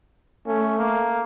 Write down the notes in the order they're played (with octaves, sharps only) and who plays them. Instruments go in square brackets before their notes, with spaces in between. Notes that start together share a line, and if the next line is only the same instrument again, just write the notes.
[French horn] A3 [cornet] C#4
[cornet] A#3